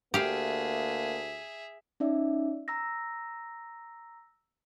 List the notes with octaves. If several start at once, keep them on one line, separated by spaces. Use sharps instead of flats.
D2 A#3 G4 G#4 E5 F5
C#4 D#4 D5 E5
A#5 E6 A#6